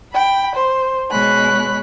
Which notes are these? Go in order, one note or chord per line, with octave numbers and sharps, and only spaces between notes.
G5 B5
C5
B2 G#3 C#5 B5 F#6